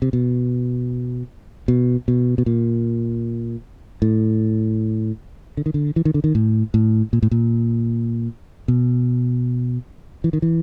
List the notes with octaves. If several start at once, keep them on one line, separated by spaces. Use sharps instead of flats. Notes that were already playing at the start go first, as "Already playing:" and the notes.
C3
B2
B2
B2
B2
A#2
A2
D3
D#3
D3
E3
D#3
D3
D#3
A2
A2
A#2
A2
A#2
B2
E3
D#3
E3